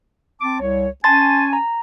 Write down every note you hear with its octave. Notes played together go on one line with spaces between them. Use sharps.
C4 A5 D6
C2 C#5
C#4 G#5 A5 C6 A6
A#5